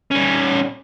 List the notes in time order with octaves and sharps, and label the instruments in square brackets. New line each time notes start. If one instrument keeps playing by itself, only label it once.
[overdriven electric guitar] G3 C#4